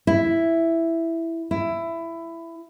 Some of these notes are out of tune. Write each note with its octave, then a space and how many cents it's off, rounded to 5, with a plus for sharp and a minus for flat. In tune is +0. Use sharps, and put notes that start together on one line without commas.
E4 +5
E4 +15